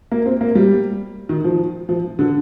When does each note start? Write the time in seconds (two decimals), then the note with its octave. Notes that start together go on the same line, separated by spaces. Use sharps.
0.11 A#3
0.26 C4
0.41 A#3
0.55 G3
1.29 D#3
1.44 F3
1.89 F3
2.19 D3